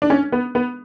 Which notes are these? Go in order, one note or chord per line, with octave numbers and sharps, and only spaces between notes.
D4
C#4
B3
B3